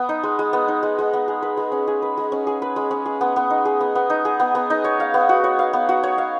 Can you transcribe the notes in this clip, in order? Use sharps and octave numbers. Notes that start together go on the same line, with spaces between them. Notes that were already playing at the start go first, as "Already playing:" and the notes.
Already playing: B3
D#4
G#3
G#3
B3
D#4
G#3
G#3
B3
G#4
B4
G#3
C#4
G#4
B4
G#3
C#4
G#4
B4
G#3
C#4
G#4
B3
B3
D#4
G#4
B3
B3
D#4
G#4
B3
B3
D#4
C#5
F5
B3
F#4
C#5
F5
B3
F#4
C#5
F5